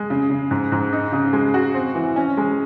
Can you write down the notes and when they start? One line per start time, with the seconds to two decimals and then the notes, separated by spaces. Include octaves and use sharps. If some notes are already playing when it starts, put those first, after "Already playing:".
Already playing: G#3
0.10 C#3
0.30 C#3
0.51 G#2
0.72 G#2
0.93 D#4
1.12 C#3
1.33 G#3
1.54 F#4
1.74 C4
1.95 E3
2.16 C#4
2.37 G#3